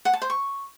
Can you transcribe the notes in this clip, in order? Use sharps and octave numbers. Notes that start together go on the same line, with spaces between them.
F#5
A5
C5
C#6